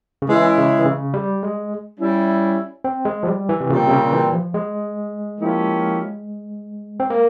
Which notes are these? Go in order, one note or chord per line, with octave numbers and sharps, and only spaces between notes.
C#3
E3 G#3 C#4 E4
C#3
E3
C#3
G3
G#3
G3 C#4 E4
C4
G#3
F3
G3
E3
C3
A#2 C#3 G3 C4
C3
C#3
E3
F3
G#3
F3 A#3 C#4 E4 G4
C4
A#3